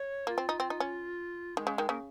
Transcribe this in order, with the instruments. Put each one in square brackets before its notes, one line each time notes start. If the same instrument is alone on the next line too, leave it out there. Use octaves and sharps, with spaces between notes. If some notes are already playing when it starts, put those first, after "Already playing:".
Already playing: [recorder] C#5
[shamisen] A#3 [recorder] F4
[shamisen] C4
D#4
C4
D#4
C#4
[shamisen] D#3 [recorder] G#3
[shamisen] C#3
D#3
[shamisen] C#3 [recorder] A#3